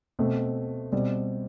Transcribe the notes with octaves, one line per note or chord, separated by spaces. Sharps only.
B2 A3 C4
B2 G3 C4